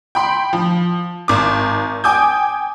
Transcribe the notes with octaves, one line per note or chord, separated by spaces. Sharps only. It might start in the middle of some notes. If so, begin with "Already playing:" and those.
G5 B5 C6
F3
G#1 D6
G5 G#5 D6 D#6 G6